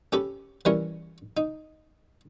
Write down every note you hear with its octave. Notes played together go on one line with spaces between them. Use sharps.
C#4 G4 A4 B4
E3 G3 C#4 E4 A#4 C#5
D#4